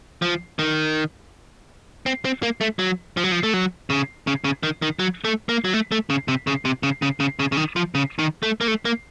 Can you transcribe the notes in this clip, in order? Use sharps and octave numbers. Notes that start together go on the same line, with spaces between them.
F3
D#3
C4
C4
A#3
A3
F#3
F3
F#3
F3
A3
F#3
C#3
C#3
C#3
D#3
D#3
F#3
A3
A#3
F#3
A3
A3
C#3
C3
C#3
C3
C#3
C#3
C#3
C#3
C#3
D#3
F3
C#3
D#3
A3
A#3
A3
A#3